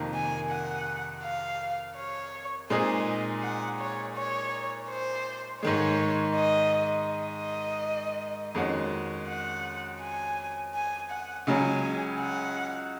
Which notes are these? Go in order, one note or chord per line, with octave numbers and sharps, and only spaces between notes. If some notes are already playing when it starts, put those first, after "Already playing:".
Already playing: F2 C3 D#3 A#3
G#5
F#5
F5
C#5
A#2 G#3 C4 D#4 G#4 D#5
F#5
C#5
C#5
C5
G#2 D#3 G#3 C#5
D#5
D#5
F2 D#3 G#3 C#4 F#4
F#5
G#5
G#5
F#5
C#2 C#3 F#3 G#5
F#5